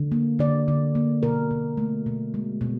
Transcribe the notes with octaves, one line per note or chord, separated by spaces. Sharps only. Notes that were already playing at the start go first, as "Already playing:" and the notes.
Already playing: D3
A#3
D3 D5
D3
A#3
B2 A#4
B2
A3
B2
G#3
B2